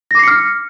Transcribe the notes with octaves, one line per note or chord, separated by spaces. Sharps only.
D6 F6 A#6 C7 C#7